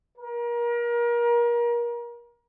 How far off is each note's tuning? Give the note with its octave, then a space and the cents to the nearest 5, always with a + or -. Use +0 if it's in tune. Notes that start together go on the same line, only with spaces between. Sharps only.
A#4 +30